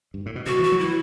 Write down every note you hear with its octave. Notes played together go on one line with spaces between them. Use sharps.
G2
A2
B2
C3 F#4
E3
F#4
F#3
E3 E4